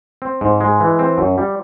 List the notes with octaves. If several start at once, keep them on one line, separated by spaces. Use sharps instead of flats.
C4
G#2
G#3
E3
C4
F#2
G3